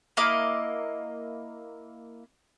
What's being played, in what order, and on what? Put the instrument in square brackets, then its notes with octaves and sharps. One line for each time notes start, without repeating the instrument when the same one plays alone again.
[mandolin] A#3 E4 D#5 D6